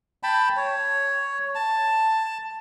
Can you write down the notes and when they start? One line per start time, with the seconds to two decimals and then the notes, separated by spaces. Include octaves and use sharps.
0.23 G5 A5 B5
0.57 C#5
1.55 A5